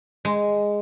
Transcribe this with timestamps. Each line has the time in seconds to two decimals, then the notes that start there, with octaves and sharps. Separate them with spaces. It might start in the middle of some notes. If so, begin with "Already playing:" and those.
0.25 G#3